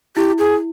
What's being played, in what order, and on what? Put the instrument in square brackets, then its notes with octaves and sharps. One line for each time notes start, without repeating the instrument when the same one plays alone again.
[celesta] E4 [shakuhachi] G4
[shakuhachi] G#4